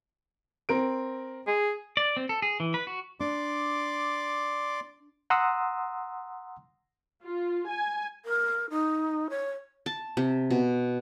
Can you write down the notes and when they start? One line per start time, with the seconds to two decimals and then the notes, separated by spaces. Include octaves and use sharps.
0.69 C4 A#4 D7
1.47 G#4
1.97 D5
2.17 C4
2.29 A4
2.42 G#4
2.60 E3
2.74 B4
2.87 F#4
3.20 D4 D5 C6 D6
5.30 F#5 A#5 C6 D#6 E6
7.24 F4
7.68 G#5
8.25 A#4
8.70 D#4
9.30 C#5
9.86 A5
10.17 C3
10.51 B2